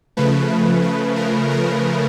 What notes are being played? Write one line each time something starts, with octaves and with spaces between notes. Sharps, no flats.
C#3 F3 A3 B4
B4
A#4
A#4